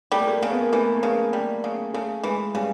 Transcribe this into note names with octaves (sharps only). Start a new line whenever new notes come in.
G3 A3
A#3
A3
C#3 A#3
B3
A#3
E3 A3
A#3
C#3 B3
G3
C#3
C#3 A3
E3 G#3
C#3 G3